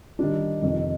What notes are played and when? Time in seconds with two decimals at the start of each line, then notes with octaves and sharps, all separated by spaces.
0.19 D#3 G3 D4
0.62 F2 C3 D#3